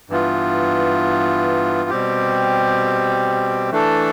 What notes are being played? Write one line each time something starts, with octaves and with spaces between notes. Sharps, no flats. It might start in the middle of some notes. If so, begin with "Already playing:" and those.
G2 E3 B3 F4
B2 G3 C4 G4
E3 A3 D4 A4